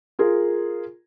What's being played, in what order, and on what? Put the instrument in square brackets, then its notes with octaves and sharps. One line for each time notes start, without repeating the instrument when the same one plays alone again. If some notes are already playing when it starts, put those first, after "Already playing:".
[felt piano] F4 G#4 A#4